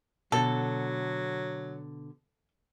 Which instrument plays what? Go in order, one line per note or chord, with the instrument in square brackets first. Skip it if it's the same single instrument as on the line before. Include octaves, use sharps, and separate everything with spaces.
[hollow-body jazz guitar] B2 D3 [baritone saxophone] F#3 [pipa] A4